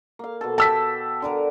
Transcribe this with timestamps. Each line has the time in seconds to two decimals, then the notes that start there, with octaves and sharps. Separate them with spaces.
0.19 A#3 F5
0.41 B2 A4
0.58 G4 A5 E6 B6
1.22 D3 A#4